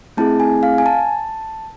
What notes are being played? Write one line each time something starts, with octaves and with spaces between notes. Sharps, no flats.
A3 C4 E4 G#4 A5
G#5
F5
G#5
A5